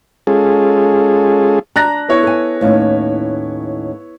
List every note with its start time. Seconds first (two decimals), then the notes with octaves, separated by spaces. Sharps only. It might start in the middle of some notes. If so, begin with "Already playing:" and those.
0.27 G#3 C#4 F4 G#4 A4
1.76 D4 A#5 F#6 A#6
2.09 B3 E4 C#5
2.23 A4 G#5
2.61 D#2 A2 C#4